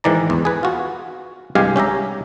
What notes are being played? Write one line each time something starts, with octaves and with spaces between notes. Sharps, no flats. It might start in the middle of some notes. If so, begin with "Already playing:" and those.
G#2 D#3 E3 D5 A#5
E2
G#4 B4
F4 F#4
C2 G2 G#3 G4 F5 G#5
C#4 G4 E5 A#5